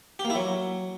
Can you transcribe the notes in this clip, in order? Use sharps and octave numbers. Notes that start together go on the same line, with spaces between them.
G4
A#3
E4
F#3